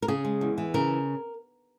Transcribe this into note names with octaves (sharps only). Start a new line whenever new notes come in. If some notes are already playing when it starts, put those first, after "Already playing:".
A#4
C#3 G#4
G#3
E2
E3
C#3 A#4